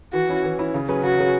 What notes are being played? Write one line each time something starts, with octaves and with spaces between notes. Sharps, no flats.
E3 F#4
C#4 E4
E3
C#4 E4
C#3
F#3 C#4 G#4 B4
C#3 F#4
F#3 C#4 G#4 B4